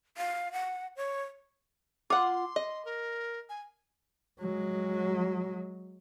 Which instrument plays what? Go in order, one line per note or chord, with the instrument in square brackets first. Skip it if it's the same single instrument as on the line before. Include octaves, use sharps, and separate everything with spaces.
[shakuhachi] F5
F#5
C#5
[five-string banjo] F4 F#5 [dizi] C6 [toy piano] D6
[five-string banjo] D#5
[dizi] A#4
G#5
[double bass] F#3 G#3